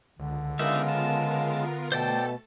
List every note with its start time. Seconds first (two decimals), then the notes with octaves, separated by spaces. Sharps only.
0.19 C#2 D3
0.59 C#3 G#3 B3 D4 D#4 F4 A#4 E5
0.88 A5
1.92 B2 A3 A4 C5 D5 G5 A5